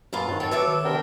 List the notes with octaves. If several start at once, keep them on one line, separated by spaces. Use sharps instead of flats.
F#2 A#2 F4 B4 F5 A5
G2 D#3 F#3 C4
A4 C#5 G5 A6
F#4 B4 C#5 E5 D6
D#3 B4
C3 B3 C4 D4 A#4 G5